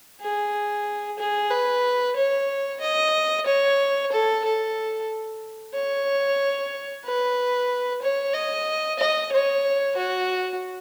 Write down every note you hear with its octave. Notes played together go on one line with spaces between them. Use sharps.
G#4
G#4
B4
C#5
D#5
C#5
A4
A4
C#5
B4
C#5
D#5
D#5
C#5
F#4